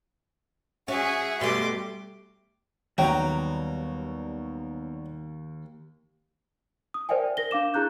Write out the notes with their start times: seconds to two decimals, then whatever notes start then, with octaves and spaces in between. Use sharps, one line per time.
0.88 C#4 F#4 G#4 E5
1.41 B2 G3 A3 C6 D6
2.98 D#2 F#3 G3 B3 G5 A#5
6.94 D#6
7.09 A#4 C5 D5 E5 G5 G#5
7.37 A#4 A#6 G7
7.51 D4 F5 D6 E7
7.74 E4 G#4 A#5 F#6 G6